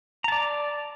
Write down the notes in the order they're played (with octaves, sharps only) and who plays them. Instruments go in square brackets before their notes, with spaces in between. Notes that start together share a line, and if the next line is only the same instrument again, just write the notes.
[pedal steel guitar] A#5
A5
D5